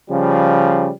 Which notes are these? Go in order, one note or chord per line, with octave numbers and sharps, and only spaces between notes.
C#3 F3 G3